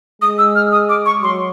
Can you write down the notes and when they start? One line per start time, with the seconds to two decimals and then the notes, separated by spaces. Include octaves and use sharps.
0.22 G#3 D#6
0.38 E6
0.55 F6
0.72 D#6
0.89 D6
1.06 C#6
1.22 F#3 C6